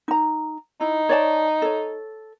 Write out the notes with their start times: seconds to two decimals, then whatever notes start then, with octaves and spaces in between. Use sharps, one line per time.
0.08 D#4 A#5
0.81 D#4 E4
1.09 C#5 D5 A5
1.62 A4 C#5